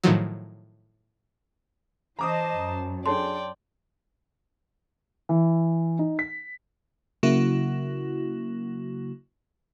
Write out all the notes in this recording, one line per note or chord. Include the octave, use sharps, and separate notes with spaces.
A2 D#3 F3 F#3
E3 C5 D#5 A5 A#5 D6 D#6
F#2
D4 G#4 A4 C#5 D5 G5 A5 C6
E3
D#4
B6
C#3 F#3 A#3 E4 F#4